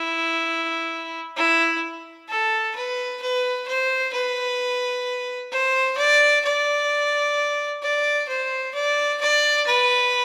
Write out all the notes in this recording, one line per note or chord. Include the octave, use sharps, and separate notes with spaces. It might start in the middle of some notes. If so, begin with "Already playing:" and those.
Already playing: E4
E4
A4
B4
B4
C5
B4
C5
D5
D5
D5
C5
D5
D5
B4